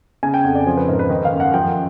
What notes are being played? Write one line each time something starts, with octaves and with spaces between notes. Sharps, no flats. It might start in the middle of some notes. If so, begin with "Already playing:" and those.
C#3 G#5
G5
F2 F#5
D5
F3 C5
B4
G#2 A#4
B4
D#3
F5
F#2
F#5
F3 G5